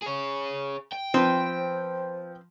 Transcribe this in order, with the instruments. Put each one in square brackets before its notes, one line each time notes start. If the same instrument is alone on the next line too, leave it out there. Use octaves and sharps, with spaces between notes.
[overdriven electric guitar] G#4 C#5
G5
[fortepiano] F3 [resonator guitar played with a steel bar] C4 B4 [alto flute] C5